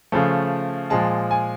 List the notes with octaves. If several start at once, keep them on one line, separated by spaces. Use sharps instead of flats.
C#3 F3 A3
A#2 F3 G#3 A5
G#5